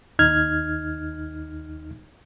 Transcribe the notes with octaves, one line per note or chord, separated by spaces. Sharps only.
D#2 D#4 F6 G#6